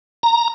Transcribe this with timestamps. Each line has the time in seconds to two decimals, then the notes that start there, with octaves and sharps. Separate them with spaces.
0.23 A#5